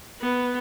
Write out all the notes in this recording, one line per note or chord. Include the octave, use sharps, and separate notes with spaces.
B3